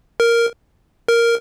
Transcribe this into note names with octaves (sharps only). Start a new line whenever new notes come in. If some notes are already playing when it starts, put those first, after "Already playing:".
A#4
A#4